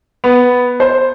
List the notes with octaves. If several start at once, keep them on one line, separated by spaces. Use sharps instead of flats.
B3
C5